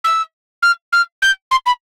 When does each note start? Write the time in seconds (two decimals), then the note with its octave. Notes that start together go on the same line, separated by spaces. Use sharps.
0.04 E6
0.63 F6
0.93 F6
1.22 G6
1.51 C6
1.66 B5